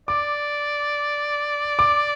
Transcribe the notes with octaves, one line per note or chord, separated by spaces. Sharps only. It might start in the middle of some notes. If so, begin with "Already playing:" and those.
D5 D6
D6